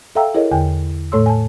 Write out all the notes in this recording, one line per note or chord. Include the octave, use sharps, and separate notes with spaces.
A4 E5 F5 G5 A#5 E6
E4 G#4 A#4 C#5 D#5
E2 D3 G5 G#5
A2 A3 A4 C#5 C6 E6
G#5 A5